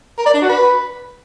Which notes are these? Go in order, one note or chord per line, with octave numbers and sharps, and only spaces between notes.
A#4
D5
D4
F#4
B4